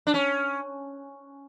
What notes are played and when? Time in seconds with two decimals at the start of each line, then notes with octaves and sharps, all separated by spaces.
0.07 D4
0.14 C#4